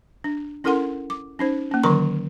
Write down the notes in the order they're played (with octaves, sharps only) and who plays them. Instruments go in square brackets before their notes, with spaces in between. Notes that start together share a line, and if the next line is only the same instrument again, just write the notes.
[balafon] D4
C#4 E4 A4 A#4 F#5 C6
D6
C#4 D#4 C5
A#3 C#4
D3 D#3 F#3 A#4 A#5 C#6